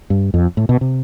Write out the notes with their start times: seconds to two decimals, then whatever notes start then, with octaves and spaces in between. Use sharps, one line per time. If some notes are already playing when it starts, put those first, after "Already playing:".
0.10 G2
0.34 F2
0.57 A2
0.69 B2
0.81 C3